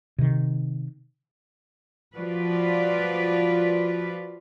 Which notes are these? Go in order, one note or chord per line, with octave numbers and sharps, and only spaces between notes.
C3 D#3
F3 F4 F#4 B4 D5